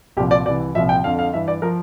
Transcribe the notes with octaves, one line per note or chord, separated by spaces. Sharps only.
C2 A#2 F3 G4
D5
C2 C3 E3 D5
C2 A#2 F3 E5
G5
F2 D3 F3 F5
F5
G2 E3 E5
D5
F3 A#4